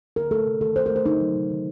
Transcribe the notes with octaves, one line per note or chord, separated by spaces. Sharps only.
D3 A#4
A3 A4
C3
D#3 A4
D#3 C5
A#4
A3
C5
D3 D#4
F#3
C3
D#3